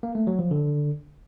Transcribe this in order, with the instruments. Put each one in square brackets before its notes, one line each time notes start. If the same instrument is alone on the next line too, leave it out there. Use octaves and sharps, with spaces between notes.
[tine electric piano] A#3
A3
F#3
F3
D3